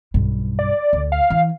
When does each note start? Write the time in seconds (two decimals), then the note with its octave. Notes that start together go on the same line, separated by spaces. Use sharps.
0.14 B1 G2
0.59 D5
0.93 D2
1.12 F5
1.30 E3